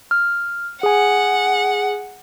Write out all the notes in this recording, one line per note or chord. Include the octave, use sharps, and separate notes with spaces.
F6
G#4 F#5 G#5